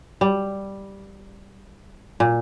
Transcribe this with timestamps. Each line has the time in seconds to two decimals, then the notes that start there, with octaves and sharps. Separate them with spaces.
0.21 G3
2.20 A#2